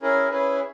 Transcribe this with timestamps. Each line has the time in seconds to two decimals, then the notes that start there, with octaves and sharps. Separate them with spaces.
0.02 C#4 E4 G#4 A#4
0.31 C#4 E4 G#4 B4